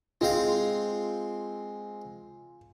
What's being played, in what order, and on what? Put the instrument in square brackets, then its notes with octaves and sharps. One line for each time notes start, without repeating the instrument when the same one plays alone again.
[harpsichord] G#3 C4 F5 [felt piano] F4